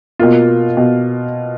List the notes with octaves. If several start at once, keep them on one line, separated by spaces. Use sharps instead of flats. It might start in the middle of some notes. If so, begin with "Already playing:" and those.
B2 A#3 F4
B2